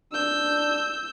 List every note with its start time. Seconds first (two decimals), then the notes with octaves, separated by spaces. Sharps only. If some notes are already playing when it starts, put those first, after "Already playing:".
0.12 D4 E6 G6